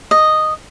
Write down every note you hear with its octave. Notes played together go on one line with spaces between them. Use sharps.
D#5